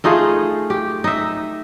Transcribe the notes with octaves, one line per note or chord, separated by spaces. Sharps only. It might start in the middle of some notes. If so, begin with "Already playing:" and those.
A3 D#4 F4 G#4
G4
D#4 E5